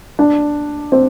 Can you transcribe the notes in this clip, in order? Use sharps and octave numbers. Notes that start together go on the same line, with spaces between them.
D4
C4